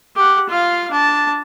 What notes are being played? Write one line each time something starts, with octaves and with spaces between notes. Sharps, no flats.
G4 F#5
F4 F5
D4 A5